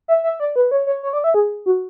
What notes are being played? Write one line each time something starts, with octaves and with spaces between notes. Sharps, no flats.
E5
E5
D5
B4
C#5
C#5
C#5
D5
E5
G#4
F#4